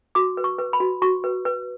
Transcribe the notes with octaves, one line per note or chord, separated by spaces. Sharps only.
F#4 D6
B4
C#6
B4
B5
F#4
F#4 C#6
B4
B4